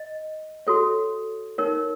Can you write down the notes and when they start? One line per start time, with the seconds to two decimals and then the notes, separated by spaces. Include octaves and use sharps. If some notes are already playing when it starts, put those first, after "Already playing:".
Already playing: D#5
0.67 F#4 A4 C#5
1.58 D#4 A#4 C#5